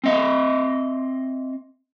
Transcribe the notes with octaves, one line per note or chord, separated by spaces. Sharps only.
C4 D#5 E5